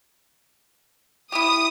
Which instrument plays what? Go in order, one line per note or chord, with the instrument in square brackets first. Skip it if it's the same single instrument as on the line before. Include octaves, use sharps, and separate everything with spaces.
[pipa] E4 G4 [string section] D#6